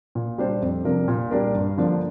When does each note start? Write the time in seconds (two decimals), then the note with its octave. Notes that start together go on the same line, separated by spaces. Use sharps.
0.15 A#2
0.38 G3 D4 G4 C5
0.62 F2
0.85 C3 F3 D4 A#4
1.08 A#2
1.31 G3 A#3 D4 A#4
1.54 G2
1.77 D3 F3 A#3 D4